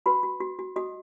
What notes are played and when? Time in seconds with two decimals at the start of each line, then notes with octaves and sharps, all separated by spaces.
0.06 F#4 B4 B5
0.23 F#4
0.41 F#4
0.59 F#4
0.76 F#4 D#5 D#6